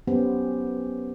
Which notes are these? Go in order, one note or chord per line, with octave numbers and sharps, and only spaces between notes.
F#3 B3 C#4 G4 C5